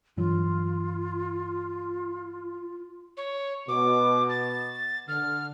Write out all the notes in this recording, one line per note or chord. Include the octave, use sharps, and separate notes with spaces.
G2 E3 F#3 F4
C#5
B2 D6
A6
D3 F6